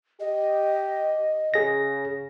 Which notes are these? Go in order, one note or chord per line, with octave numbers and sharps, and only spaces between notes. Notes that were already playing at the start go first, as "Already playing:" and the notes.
G4 D#5
C#3 G#4 A#6